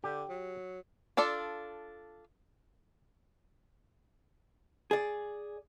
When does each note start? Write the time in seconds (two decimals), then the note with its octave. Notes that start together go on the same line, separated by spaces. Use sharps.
0.04 D3 G4
0.29 F#3
1.17 D4 F4 A4 D5
4.91 G#4 D5